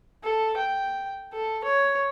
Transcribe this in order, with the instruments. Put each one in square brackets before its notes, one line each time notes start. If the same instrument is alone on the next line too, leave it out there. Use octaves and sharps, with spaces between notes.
[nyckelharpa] A4
G5
A4
C#5